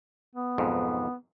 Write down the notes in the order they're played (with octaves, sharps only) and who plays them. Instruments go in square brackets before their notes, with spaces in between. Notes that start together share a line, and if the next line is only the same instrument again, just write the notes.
[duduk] B3
[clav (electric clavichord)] B1 F2 G#2